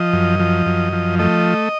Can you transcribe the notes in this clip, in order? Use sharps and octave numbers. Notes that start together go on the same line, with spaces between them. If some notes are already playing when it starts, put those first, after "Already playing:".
Already playing: F3 D#5
F#2
F3
F#2
F3
A3 D#5